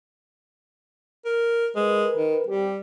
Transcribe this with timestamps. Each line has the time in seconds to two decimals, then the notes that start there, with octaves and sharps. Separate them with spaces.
1.25 A#4
1.76 G#3 A#4 B4
2.16 D#3
2.47 G3 C4 G4